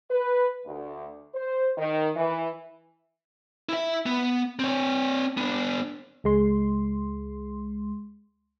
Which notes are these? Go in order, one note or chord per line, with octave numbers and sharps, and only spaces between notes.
B4
D2
C5
D#3
E3
E4 E5
B3
C4 C#5
B3 D4
C#2 G#3 C6